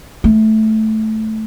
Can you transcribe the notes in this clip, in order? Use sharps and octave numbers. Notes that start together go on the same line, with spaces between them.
A3